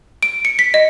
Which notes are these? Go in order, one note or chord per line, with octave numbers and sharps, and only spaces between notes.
D7
C#7
B6
D#5